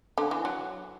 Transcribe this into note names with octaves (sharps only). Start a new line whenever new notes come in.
D3
E3
F#3